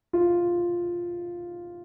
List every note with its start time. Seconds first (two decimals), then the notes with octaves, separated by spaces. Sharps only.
0.13 F4